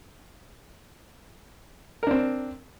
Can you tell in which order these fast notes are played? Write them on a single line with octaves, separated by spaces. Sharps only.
A#4 D4 C4